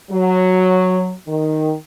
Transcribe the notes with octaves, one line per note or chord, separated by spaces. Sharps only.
F#3
D#3